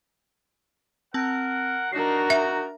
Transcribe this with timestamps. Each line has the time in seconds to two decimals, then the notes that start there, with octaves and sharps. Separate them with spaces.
1.14 C4 A#4 F#5 A5
1.92 D4 D#4 F#4 A#4 C7
2.30 E5 A#5